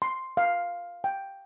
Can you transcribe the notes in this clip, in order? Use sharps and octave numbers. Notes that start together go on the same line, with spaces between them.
C6
F5
G5